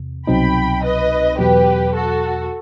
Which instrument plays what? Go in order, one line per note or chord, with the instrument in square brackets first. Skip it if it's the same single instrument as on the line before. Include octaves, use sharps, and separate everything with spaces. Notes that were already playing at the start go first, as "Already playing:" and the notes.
Already playing: [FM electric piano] E2 C3
[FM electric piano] C2 B2 F#3 C4 D#4 [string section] G5 B5
[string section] B4 D#5
[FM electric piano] E2 B2 F#3 [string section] G4 B4
[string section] F#4 A4